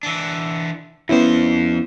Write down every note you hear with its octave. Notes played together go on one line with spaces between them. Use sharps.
E3 D4
F2 B3 C#4 E4 C5